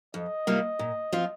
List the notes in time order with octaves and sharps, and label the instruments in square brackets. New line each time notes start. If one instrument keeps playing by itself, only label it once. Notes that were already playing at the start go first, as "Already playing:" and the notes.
[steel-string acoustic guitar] F2 [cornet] D#5
[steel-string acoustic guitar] C3 G3 A#3 F4
A#2
F3 C4 F4